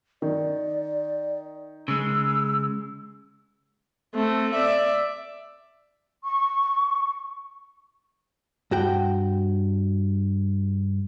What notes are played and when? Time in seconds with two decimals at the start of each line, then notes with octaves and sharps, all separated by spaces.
0.22 D#3 D5
1.88 C#3 G#3 E6
4.15 A3 C4
4.55 D5 E5
6.23 C#6
8.71 G2 F#4 G5